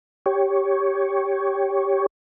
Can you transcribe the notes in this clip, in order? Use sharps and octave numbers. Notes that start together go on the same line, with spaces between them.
G4 C#5